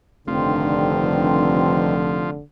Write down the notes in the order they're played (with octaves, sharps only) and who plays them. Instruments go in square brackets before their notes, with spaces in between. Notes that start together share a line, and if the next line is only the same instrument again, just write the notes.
[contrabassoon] F1 [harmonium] G2 D#3 C4 [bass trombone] D3 [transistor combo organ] F3